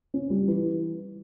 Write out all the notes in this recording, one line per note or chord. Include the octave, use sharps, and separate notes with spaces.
C#4
G3
E3